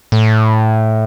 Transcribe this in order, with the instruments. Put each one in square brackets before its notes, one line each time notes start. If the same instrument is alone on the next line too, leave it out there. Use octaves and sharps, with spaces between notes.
[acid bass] A2